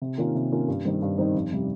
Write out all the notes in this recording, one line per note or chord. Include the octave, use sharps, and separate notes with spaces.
C3
D#3 A#3 C#4 F4
C3
D#3 A#3 C#4 F4
G2
D#3 G3 C4 D#4
G2
D#3 G3 C4 D#4
F1
C3 G3